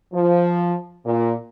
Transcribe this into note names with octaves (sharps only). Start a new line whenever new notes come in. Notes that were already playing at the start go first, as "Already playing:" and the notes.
F3
A#2